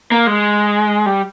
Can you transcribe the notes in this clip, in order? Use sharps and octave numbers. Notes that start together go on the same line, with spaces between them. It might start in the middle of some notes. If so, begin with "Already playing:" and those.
A#3
G#3
G3